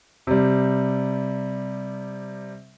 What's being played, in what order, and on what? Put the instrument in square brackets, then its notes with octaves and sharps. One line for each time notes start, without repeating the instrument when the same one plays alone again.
[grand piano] C3 G3